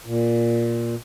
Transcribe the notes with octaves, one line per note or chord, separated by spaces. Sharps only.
A#2